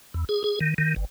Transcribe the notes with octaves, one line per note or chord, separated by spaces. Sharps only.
E2
G#4
G#4
D#3
D#3
G1